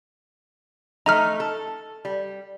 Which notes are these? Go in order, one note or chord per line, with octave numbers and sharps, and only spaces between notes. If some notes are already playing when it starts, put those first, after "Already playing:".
A3 D#4 A#5 F6
A4
G3